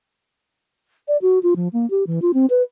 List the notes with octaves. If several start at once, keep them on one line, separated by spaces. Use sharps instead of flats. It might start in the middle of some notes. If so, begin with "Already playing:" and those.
D5
F#4
F4
F3
A#3
G4
E3
F4
C4
B4